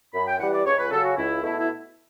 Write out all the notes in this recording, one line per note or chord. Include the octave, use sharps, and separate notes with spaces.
F#2 B5
G5
E3 G3 F#5
D5
C#2 C#5
B4
C#3 F#3 C#4 A4
F#4
C#2 E4
B2 A3 E4
E4